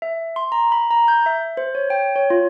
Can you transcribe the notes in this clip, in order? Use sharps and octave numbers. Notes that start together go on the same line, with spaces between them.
E5
C6
A#5
B5
A#5
G6
E5
C5
C#5
G5
C#5
F4